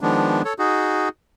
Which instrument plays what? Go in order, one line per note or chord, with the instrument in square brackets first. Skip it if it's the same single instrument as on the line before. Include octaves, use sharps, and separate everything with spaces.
[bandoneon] D#3 F3 G#3 B3 D4
A4 C#5
D#4 F#4 G#4